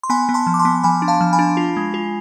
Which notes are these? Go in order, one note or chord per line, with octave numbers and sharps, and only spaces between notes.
C6
B3 G#5 B5
B3
A5 C6
F3
D6
A5 C6
B3
F3 G#5 B5
D4
F5 A5
F3
G#5 B5
D4
F4
G#3
F4